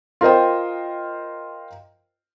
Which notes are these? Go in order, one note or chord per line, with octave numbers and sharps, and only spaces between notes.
F4 A#4 C5 D#5 G5